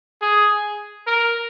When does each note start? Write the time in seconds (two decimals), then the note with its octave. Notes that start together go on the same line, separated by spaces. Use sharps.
0.22 G#4
1.07 A#4